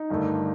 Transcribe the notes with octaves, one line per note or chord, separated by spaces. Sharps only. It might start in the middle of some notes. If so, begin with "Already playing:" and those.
Already playing: D#4
G1 G2 D#3 A3